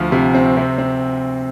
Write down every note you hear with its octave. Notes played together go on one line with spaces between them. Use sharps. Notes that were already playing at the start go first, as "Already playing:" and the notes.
Already playing: D2 F3
C3
C4
C3
C4